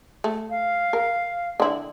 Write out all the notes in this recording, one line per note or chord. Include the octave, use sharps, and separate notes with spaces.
A3
F5
A#4
D3 E4